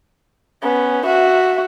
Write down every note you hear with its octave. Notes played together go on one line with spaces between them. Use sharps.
B3 C#4
F#4 E5